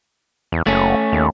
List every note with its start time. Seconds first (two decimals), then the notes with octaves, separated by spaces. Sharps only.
0.52 E2
0.67 F#1 A3 C#4
1.12 D#2